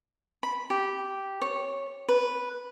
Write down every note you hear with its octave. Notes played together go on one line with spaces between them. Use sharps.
B5
G4
C#5
B4